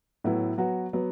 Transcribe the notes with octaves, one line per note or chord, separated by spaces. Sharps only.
A2 F#3 B3 E4
F#3 B3 F#4
F#3 B3 F#4